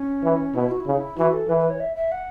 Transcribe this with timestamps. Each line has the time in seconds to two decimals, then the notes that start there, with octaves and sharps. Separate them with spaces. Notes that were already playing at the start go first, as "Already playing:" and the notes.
Already playing: C#4
0.23 E3
0.55 B2 E4
0.71 F#4
0.80 E4
0.87 C#3 C#4
0.97 E4
1.18 E3 F#4
1.33 A4
1.49 E3 B4
1.60 B4
1.70 C#5
1.80 E5
1.96 E5
2.12 F#5